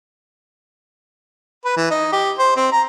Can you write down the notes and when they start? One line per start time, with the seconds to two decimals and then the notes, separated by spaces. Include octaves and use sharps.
1.65 B4
1.77 E3
1.91 D#4
2.13 G4
2.39 C5
2.57 C4
2.72 A#5